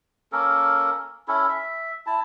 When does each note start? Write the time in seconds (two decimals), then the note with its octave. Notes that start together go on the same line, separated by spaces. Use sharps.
0.32 A#3 C#4 A4 A#4
1.28 C#4 E4 A4
1.49 E5
2.06 E4 A5